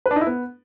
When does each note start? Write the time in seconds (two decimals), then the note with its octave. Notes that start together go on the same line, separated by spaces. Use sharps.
0.06 B4
0.11 D4
0.16 D#4
0.21 E4
0.27 B3